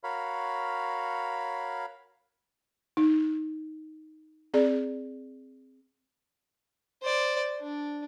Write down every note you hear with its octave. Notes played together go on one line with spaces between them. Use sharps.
F#4 A#4 C#5 F5 B5
D#4
C4 G#4 D5
C5 D5
D4